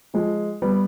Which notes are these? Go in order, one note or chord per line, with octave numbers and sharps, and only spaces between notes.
F3 G#3
G3 B3